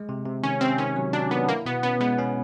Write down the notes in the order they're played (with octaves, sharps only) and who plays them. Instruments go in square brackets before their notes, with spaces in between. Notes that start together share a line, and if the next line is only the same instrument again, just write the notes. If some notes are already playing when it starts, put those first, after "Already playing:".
Already playing: [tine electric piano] G#3
C3
C3
[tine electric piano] D#3 [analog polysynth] C#4
[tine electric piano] C3 [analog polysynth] C4
[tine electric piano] D#3 [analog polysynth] C#4
[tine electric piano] F#3
[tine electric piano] F#3 [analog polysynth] D4
[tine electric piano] D#3 [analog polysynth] B3
[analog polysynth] A#3 [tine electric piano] E4
[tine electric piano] B2 [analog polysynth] B3
[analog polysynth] B3 [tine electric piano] C#4
[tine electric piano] G#3 [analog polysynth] B3
[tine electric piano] C#4